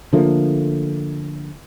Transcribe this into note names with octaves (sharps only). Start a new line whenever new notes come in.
D3 F3 A3 A#3